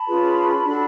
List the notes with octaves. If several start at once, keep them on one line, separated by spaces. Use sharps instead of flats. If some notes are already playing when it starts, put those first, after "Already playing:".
Already playing: A5 B5
C#4 F4 G#4 B4
D4 F#4 A4